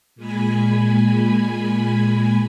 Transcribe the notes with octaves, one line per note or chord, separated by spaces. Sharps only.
A#2 G#3 G#5 B5